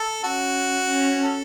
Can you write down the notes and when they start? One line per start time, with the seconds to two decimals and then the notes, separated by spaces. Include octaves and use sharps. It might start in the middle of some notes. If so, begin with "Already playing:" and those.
Already playing: A4
0.23 C#4 F#4
0.89 C#4
1.23 A4